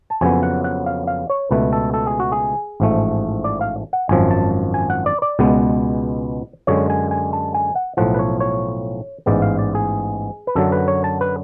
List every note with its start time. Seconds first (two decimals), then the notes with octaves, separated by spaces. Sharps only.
0.10 A5
0.21 F2 C#3 F#3 B3 G#5
0.43 F#5
0.64 F#5
0.86 F5
1.07 F5
1.30 C#5
1.51 C#2 B2 A3 B4
1.73 A4
1.94 A4
2.07 G#4
2.20 F#4
2.32 G#4
2.80 A1 G#2 F3 A3
3.44 D5
3.61 F5
3.93 F#5
4.09 G#1 F#2 F3 G#5
4.31 A5
4.74 G#5
4.90 F#5
5.06 D5
5.22 D5
5.39 C#2 B2 G#3 B3
6.67 F#2 D3 G#3 C#5
6.90 G#5
7.11 G#5
7.33 A5
7.54 G#5
7.75 F#5
7.97 B1 A2 F3 F#5
8.14 B4
8.19 C#5
8.40 C#5
9.26 A1 G#2 G#3 B3 D5
9.42 F5
9.59 D5
9.75 G#4
10.47 B4
10.55 F#2 D3 F#3 A4
10.72 B4
10.88 C#5
11.04 A5
11.21 B4